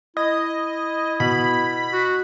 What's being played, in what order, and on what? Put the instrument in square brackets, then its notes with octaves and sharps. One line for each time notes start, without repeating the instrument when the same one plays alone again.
[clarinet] E4 [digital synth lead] D#5
[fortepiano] B2 [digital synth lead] B5
[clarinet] F#4